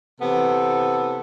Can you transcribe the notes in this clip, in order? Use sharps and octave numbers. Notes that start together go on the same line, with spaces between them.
C3 E3 B3 A4